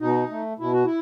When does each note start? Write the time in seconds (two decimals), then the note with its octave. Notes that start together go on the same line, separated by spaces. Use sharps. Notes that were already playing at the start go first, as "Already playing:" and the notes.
0.01 B2 D#4
0.30 A3
0.59 B2 E4
0.73 F#4
0.85 E4